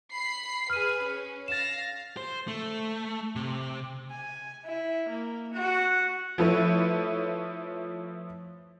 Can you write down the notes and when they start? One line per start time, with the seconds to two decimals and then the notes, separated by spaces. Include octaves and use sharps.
0.10 B5 C7
0.70 G#4 B4 F6 D#7
1.02 C#4
1.48 F5 A6 A#6 E7
2.17 C5
2.48 A3
3.36 C3
4.11 G#5
4.65 E4
5.08 A#3
5.53 F#4
6.38 F3 A3 E4 B4 C#5